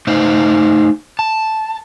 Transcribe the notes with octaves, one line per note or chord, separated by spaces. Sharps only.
A3 D#4 C5 D#5 F5
A5